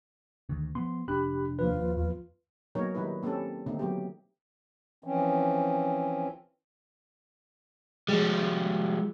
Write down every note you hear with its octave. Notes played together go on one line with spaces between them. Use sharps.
D2 D#3
F3 B3 C6
F1 D4 G4 B5 F#6
D#2 F3 F4 B4
E2 F4
F#3 A#3 B3 D#4 A#4 C#5
D#3 G3 D#4 E4 B4
A#3 C4 C#4 G4 A4
D3 D#3 A3 A#3 C4 D#4
F#3 B3 G4
E3 F3 C4 C#4
F3 G3 G#3